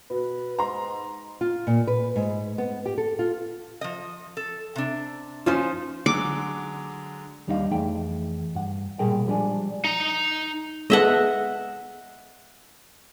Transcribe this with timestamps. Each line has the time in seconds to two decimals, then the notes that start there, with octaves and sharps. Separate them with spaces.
0.10 B2 B4
0.59 G#2 A#5 C6
1.41 F4
1.67 A#2
1.87 B4
2.16 G#2
2.58 B3
2.86 G4
2.98 A4
3.19 F4
3.81 F3 D#5
4.37 A4
4.76 C3 D4
5.46 F3 C#4 D#4 F4 C5
6.06 D3 F#3 G#3 D6
7.47 D#2 G3 D4 D#4 A#4 F5
7.70 F2 E3 A3 G#4 G5
8.55 G2 F#5
8.99 B1 A#2 G3 G#4 A#4 G5
9.26 F3 G3 G#3 D4 G#4
9.84 D#4 A#5
10.90 G#3 B3 A4 D#5 E5 F#5